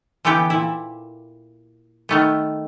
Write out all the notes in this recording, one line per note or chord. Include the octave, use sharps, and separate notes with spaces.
D3 E3 B3 G4 G5
A#2 E4
D#3 A3 B3